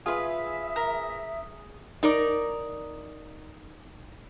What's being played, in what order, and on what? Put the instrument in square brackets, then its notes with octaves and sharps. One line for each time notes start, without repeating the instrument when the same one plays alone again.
[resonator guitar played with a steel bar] F4 B4 [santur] G#4 [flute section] E5
[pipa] A#4
[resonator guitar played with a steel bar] D#4 A#4 D5